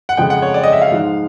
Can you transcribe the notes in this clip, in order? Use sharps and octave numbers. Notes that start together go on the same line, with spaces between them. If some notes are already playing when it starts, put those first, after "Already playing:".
F#5
F2 C#3 F3 G#3 G5
F#5
C#5
D5
D#5
E5
F5
G#2 F3 G#3